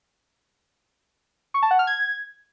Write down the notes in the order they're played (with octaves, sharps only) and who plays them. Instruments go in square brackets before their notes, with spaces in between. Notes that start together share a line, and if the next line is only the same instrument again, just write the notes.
[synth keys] C#6
A5
F#5
F6
G#6